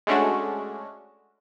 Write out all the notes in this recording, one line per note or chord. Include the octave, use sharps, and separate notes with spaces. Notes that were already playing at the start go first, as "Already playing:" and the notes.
G#3 A3 C#4 D4 F#4